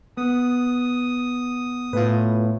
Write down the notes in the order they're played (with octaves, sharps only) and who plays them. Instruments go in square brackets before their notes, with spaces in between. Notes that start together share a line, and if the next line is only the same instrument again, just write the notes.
[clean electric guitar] B3 [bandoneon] D#6
[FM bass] A2 [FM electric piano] F4 B4